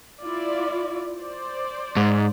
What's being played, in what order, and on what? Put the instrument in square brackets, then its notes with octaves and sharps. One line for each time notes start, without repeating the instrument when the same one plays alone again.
[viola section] E4 F4 D5
C5 D5
[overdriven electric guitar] G#2